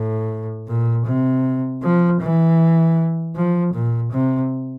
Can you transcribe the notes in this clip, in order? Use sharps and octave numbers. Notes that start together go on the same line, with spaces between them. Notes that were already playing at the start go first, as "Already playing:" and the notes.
Already playing: A2
A#2
C3
F3
E3
F3
A#2
C3